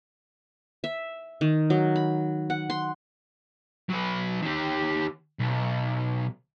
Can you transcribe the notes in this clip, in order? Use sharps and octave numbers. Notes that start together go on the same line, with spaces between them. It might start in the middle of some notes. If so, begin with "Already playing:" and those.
E5
D#3
F#3
B5
F#5
C6
F#3 B4
D#3 G4
B1